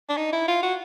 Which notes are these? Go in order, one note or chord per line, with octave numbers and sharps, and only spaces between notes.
D4
D#4
E4
F4
F#4